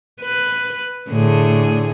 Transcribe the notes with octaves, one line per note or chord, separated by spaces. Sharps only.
B4
A2 D3 G#4